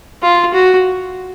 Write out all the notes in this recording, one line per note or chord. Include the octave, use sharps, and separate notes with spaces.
F4
F#4